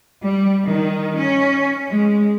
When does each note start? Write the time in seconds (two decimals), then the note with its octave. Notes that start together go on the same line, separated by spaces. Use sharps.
0.22 G3
0.65 D#3
1.16 C#4
1.87 G#3